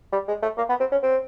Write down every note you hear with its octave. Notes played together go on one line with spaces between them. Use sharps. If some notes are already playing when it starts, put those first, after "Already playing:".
G3
G#3
A3
A#3
B3
C4
C#4
C4